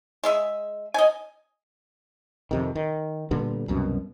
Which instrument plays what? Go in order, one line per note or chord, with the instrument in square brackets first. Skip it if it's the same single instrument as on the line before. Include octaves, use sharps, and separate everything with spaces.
[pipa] G#3 G#4 E5
D#5 G#5
[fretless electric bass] F2 C3 D#3
D#3
A#2 D3 G3 B3
C2 F#2 B2